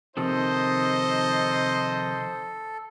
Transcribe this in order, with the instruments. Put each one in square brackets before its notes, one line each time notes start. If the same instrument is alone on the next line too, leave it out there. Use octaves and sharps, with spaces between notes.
[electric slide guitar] C3 D#3 F3 [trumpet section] D#4 C5 [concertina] A4 [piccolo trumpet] D#5